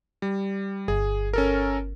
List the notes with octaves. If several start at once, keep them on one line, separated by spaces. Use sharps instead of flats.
G3
G1 G#4
C#4 A4 A#4